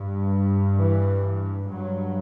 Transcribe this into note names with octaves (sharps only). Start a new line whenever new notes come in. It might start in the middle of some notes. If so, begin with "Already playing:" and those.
Already playing: G2
E3
G2 F#3